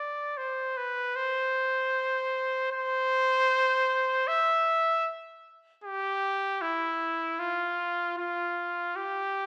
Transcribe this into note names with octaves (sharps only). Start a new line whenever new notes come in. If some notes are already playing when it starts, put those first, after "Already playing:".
Already playing: D5
C5
B4
C5
C5
E5
G4
E4
F4
F4
G4